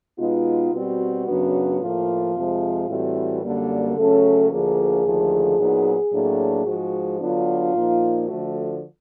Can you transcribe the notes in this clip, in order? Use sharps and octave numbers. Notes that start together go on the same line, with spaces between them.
B2 G#3 B3 D#4 F4
B2 G3 C4 F#4
F#2 C#3 F#3 B3 D4
A2 F3 A#3 F4
F2 C3 F3 G#3
A2 E3 G3 C4 F#4
F#2 D3 G3 A#3
C#3 F#3 A3 C#4 A4
D2 D3 F3 A#3 G#4
D#2 D3 F3 A3
A#2 F#3 B3 D#4
A2 F#3 A#3 D4
G#2 F3 G#3 F#4
D3 F#3 B3 D4 F4
A#2 F3 A#3 D#4
D3 F3 A3 F#4